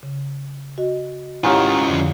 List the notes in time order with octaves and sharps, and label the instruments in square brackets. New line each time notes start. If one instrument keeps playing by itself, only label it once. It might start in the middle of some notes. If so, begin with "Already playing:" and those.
[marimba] C#3
F#4 D#5
[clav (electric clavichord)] G#2 D#3 [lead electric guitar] C#4 F4 [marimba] E4 G4 C#5
[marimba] F2 D3 F3